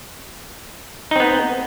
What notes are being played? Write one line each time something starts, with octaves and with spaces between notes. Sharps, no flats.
B3 C4 D#4